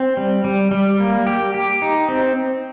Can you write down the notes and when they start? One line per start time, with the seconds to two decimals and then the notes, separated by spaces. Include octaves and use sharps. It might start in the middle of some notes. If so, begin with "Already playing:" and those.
Already playing: C4
0.17 G3
0.45 G3
0.71 G3
1.00 A#3
1.27 G4
1.54 G4
1.82 D#4
2.08 C4